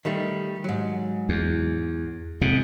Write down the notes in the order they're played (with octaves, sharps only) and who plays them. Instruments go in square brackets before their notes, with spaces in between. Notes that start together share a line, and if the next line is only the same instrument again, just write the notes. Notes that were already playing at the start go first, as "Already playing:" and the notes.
[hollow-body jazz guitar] D#3 G3 A3
G#2 F#3
[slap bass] E2
[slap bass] F2 C3 [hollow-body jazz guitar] G#2